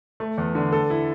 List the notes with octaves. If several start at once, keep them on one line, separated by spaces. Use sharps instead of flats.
A3
E2
D3
A4
E4